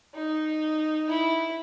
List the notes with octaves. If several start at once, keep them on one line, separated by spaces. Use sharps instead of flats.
D#4
E4